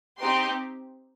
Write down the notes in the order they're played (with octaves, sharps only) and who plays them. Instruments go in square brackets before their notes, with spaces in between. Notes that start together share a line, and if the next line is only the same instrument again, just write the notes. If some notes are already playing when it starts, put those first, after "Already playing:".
[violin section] C4 D#4 G4 C6